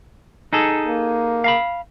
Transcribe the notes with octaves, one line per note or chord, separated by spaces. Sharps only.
D#4 G#4 A4
A#3
F5 A#5 B5